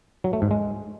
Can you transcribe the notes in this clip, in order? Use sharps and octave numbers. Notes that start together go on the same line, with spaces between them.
F#3
A3
G#2
G#3